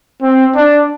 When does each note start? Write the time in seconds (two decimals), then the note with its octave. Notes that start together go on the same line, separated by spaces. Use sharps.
0.23 C4
0.55 D4